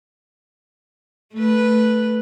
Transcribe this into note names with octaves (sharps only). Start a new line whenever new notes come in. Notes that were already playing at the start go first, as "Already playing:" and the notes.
A3 B4